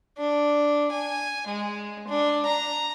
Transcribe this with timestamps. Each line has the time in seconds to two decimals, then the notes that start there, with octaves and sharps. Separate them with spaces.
0.18 D4
0.91 G#5
1.47 G#3
2.08 D4
2.45 A#5